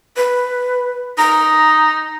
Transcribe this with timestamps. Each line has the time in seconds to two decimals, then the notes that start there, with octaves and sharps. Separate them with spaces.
0.17 B4
1.18 D#4 A#5